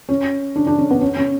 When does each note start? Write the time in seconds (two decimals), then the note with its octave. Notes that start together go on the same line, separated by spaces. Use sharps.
0.09 C#4
0.56 D4
0.67 D4
0.78 C#4
0.90 B3
1.01 C#4
1.17 C#4